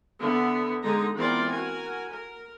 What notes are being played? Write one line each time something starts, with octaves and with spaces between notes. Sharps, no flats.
D3 B3 E5
D3 G#3 D#4 A#5
E3 B3 C4 F4 A#4 D5
F#4 A#4 G#5
A#4